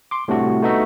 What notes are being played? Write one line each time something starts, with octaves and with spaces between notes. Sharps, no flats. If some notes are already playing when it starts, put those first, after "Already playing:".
C6 D6
A2 C3 G3 D4 F#4
A3 B3 D#4 F#4 E5